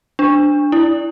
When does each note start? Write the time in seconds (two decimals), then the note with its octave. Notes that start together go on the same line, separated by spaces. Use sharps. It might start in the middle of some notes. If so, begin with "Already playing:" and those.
0.19 D4
0.72 E4